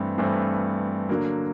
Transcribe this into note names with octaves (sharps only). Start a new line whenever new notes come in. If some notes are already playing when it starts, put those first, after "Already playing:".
Already playing: G2 E3 A3 C4
G2 E3 A3 C4
D3 F#3 A#3